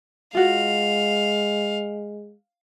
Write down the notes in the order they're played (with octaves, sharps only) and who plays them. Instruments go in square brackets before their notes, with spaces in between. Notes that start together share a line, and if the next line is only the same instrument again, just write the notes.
[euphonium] G#3 [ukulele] F4 F#4 [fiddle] F5